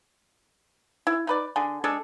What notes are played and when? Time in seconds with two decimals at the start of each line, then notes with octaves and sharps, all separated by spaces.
1.07 E4
1.27 D#4 B4 D5
1.56 D3 G#4
1.84 G#3 D4 G#4 A4